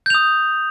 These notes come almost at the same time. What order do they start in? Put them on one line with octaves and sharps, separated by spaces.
G6 F7 D#6